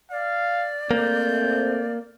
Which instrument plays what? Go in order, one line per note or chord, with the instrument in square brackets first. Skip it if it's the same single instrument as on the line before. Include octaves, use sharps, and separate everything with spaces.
[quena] D5 [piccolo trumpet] F5
[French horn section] A3 C4 [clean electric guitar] A#3 [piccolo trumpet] G6